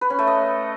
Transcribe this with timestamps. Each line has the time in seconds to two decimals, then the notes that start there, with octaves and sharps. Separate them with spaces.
0.01 B4
0.10 C#4
0.19 A3
0.27 D#5